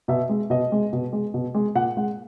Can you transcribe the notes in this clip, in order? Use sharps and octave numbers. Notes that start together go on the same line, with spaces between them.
B2 E5
G#3
B2 D#5
G#3
B2
G#3
B2
G#3
A#2 F#5
G#3 F#5